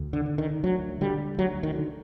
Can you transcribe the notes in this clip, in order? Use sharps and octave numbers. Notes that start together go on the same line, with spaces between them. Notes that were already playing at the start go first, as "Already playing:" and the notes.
Already playing: D2
D3
D3
D#3
D2 F#3
D3 G3
D2 F#3
D#3
D3